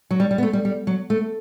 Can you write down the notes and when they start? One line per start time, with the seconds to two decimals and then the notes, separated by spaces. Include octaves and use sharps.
0.11 F#3
0.20 G3
0.31 G3
0.38 B3
0.43 A3
0.53 G3
0.65 G3
0.87 F#3
1.10 A3